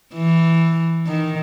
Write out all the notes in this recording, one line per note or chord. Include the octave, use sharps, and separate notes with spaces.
E3
D#3